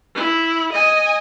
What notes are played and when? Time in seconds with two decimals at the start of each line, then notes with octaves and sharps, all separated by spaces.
0.15 E4
0.73 D#5 G#5